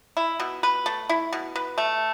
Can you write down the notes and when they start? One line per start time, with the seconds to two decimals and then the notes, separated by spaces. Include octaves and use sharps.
0.17 E4
0.40 B2
0.63 B4
0.86 A3
1.09 E4
1.33 B2
1.56 B4
1.78 A3